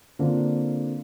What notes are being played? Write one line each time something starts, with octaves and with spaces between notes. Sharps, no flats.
D3 A#3 C4 D4 F4